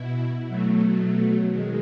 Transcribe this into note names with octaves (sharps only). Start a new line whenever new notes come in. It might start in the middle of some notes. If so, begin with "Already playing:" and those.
Already playing: B2 E4
B2 F#3 A3
D#3 G#3